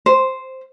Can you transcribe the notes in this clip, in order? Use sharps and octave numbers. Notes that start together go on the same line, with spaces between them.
C5